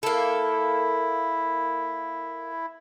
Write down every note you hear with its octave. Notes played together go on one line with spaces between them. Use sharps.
A#3 E4 A4